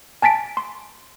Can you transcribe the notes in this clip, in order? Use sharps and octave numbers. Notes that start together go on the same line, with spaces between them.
G#5 A5 A6 B6 D7
C6